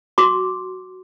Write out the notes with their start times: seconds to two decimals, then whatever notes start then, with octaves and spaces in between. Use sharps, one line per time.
0.18 F#4 C6 D6